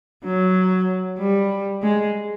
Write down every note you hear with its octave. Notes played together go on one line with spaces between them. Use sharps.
F#3
G3
G#3